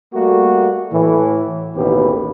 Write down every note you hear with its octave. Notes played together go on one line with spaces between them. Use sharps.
G3 A3 A#3 F#4
A2 E3
A1 D#2 B2 G4 B4